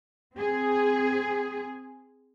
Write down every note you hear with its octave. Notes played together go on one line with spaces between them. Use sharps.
C4 G#4